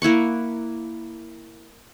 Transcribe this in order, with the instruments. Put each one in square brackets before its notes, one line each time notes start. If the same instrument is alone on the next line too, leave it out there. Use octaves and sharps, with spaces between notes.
[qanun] A#3 E4 F#5 C#6